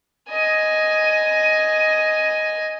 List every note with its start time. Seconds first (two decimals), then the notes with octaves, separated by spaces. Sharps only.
0.30 D#5 G#5